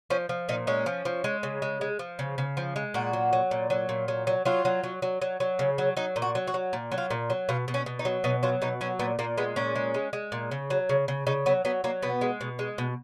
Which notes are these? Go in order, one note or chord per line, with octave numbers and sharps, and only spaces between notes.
F3 C#4
F3
A#2 D#4
G#3 C#4
F3
F3
G#3
C#3
G#3
G#3
F3
C#3
C#3
F3
G#3
A#2 F#4
F#3
F#3
A#2
F#3
A#2
F#3
F#3
F#3 F4
F#3
F#3
F#3
F#3
F#3
C#3
F#3
F#3 D#4
A#2
F#4
F#3
F#4
F#3
A#2
F#3
F4
A#2
F#3
B2 F4
B2
C#4
B2
D#4
F#3
B2 D#4
F#3 F4
B2 D#4
F#3 C#4
A#2 B3
A#2 A#3
G#3 B3
A#2 C#4
G#3
G#3
G#3
A#2
C#3
F#3
C#3
C#3
C#3 D#4
F#3 B3
F#3 B3
F#3 A#3
B2 B3
G#3
B2
G#3
B2